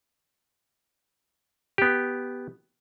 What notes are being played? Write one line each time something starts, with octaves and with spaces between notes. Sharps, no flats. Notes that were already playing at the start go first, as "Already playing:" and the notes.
B3 G4